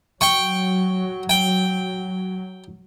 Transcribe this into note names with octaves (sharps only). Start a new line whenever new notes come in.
F#3 G5 C#6
G5